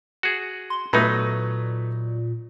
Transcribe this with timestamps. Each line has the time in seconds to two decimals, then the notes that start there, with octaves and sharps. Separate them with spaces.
0.23 F#4 G#4
0.70 C6
0.93 A#2 F#3 A3 B3 D#4 B5